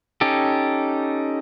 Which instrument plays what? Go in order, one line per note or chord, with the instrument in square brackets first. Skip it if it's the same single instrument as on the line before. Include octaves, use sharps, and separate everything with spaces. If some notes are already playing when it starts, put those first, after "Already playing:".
[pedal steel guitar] C#4 D#4 G4 A4